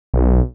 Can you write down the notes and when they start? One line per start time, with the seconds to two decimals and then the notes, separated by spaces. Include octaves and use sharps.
0.14 B1